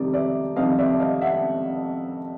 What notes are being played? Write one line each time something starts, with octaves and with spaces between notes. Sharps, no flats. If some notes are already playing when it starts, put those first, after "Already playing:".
Already playing: F2 C3 D#3 G3 D5
D5 E5
F2 C3 D#3 G3 D#5 F5
D5 E5
D#5 F5
E5 F#5